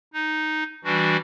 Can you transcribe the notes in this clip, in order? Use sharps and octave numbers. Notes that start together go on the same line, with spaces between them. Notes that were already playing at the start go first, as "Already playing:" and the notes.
D#4
E3 G3 D4 F#4